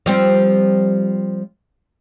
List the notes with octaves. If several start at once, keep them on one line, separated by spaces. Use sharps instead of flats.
F3 G3 C4